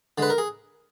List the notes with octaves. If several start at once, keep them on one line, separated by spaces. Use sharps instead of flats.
D3 G#3 B4
A#4
G#4